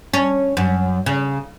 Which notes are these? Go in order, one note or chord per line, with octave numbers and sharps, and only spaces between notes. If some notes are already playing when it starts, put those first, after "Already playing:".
C#4
F#2
C#3